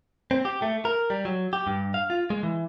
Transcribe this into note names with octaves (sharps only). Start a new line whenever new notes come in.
C4
G4
A3
A#4
G3
F#3
G4
G2
F5
F4
G#3
E3